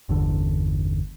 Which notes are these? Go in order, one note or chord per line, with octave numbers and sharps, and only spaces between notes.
G1 E2 D3